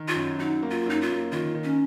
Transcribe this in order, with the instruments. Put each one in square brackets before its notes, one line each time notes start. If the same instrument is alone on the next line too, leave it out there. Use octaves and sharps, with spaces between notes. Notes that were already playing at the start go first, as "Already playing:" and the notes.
Already playing: [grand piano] D#3
[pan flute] F4
[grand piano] F#2
[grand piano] F#3 [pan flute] D#4
[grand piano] A#3
[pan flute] F4
[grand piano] F#2 [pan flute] D#4
[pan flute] F4
[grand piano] A#3
[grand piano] D#3 [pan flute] F4
[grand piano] D#3
[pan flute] C#4